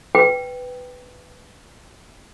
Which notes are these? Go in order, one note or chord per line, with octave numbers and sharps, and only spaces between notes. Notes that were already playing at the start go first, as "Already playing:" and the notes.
B4 G5